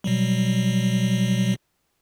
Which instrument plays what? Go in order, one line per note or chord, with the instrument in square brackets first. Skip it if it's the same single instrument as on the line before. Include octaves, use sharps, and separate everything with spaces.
[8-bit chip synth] B2 F#3 G3